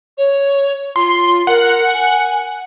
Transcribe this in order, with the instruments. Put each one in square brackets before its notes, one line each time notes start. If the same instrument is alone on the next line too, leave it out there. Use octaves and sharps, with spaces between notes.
[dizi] C#5
[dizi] F4 [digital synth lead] C6
[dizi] A#4 [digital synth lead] F#5
[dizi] G#5